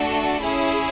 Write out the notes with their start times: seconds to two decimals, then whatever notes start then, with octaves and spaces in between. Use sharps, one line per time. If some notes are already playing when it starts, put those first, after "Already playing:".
Already playing: A3 D4 F#4 A4
0.42 C#4 E4 G#4